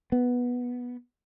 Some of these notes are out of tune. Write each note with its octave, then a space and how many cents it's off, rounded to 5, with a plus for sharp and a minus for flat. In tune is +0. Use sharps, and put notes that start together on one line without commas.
B3 -10